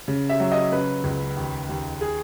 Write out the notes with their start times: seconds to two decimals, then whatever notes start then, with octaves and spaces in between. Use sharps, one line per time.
0.08 C#3
0.29 E5
0.40 F#3
0.52 D#5
0.72 C#3 B4
1.04 C#2
1.37 D#2
1.69 D#2
2.01 G#4